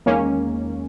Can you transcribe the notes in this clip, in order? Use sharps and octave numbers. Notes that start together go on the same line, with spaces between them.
E2 D#3 G#3 A#3 C#4